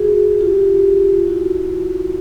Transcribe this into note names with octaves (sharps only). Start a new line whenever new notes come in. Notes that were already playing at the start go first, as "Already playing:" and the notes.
Already playing: F#4 G#4
F4 G4
E4 F#4
F4